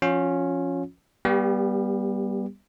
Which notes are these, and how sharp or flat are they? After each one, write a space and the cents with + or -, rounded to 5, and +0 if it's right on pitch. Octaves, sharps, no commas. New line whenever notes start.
F3 -20 C#4 +0 F4 +35
G3 +0 B3 -25 G4 +30